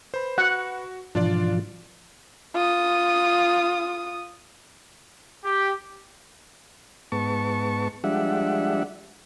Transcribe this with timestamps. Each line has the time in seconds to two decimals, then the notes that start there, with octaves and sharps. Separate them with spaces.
0.14 B4 C5 B5
0.38 F#4 F#5
1.15 G#2 B2 E3 F3 D4 F4 D5
2.54 F4 D#6
5.44 G4
7.12 G#2 B3 A5 C#6
8.04 F3 G3 G#3 D4 E5 F#5